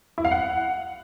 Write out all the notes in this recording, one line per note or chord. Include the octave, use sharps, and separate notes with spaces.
E4
F5
F#5